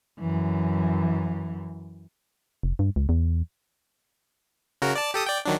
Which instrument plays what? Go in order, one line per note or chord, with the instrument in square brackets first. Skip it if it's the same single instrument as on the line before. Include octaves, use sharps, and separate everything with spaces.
[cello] F#2 E3
[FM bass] F1
G2
C#2
E2
[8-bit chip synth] C#3 F#4 A#4
D5 A5
G4 A4 D#6
D5 G5
D#3 F#3 D4